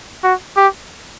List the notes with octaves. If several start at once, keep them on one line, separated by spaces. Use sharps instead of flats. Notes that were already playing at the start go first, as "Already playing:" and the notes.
F#4
G4